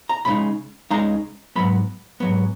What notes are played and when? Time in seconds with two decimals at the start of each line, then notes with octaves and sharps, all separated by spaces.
0.09 A#5
0.25 C#2 C#3 G#3 D#4 B5
0.91 C#2 C#3 G#3 D#4 A#5
1.56 G#2 F#3 B3 B5
2.20 G#2 F#3 B3